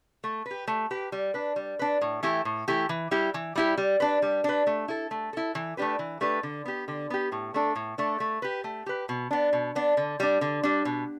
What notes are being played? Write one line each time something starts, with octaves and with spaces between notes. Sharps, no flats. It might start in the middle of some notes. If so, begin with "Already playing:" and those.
A3
B4
G4
A3
G4 B4
G3
D4 B4
G3
D4 B4
A2
E3 A3 E4 G4
A2
E3 A3 E4 G4
E3
G3 E4 G4
E3
G3 E4 G4
G3
D4 B4
G3
D4 B4
A3
E4 A4
A3
E4 A4
E3
A3 D4 G4 B4
E3
A3 D4 G4 B4
D3
B3 G4
D3
B3 G4
A2
A3 D4 A4
A2
A3 D4 A4
A3
G4 B4
A3
G4 B4
B2
B3 D4
B2
B3 D4
D3
G3 D4
D3
G3 D4
B2